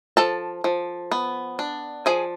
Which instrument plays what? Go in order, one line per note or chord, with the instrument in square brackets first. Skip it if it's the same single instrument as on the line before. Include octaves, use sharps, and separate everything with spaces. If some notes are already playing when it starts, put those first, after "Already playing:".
[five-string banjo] F3 A4 A5
F3
B3
D4
F3 G#4 G#5